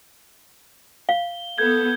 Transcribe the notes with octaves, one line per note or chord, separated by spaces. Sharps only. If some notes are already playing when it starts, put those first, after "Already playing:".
F5 G7
B3 A4 G6 G#6 G7